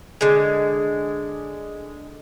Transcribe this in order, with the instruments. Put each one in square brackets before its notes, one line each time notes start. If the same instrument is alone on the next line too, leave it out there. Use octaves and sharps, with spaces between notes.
[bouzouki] D3 G#3